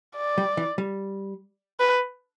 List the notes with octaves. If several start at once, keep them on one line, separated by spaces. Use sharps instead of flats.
D5
G3
E3
G3
B4